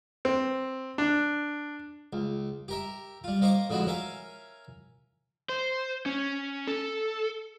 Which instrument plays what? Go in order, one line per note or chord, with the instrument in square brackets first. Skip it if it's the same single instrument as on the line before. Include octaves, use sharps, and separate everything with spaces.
[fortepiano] C4
D4
[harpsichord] C#2
G4 A#4 E5
G3 F4
A#3 C5 D#5 C#6 D6
F2 D3 G#3 E4 F#4
C#4 A#4 E5 F5 G#5
[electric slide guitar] C5
C#4
A4